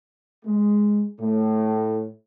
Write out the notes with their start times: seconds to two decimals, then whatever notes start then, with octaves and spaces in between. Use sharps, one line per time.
0.45 G#3
1.20 A2